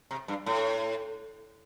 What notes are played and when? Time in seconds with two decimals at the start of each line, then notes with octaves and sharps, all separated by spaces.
0.11 C3
0.28 G2
0.46 A2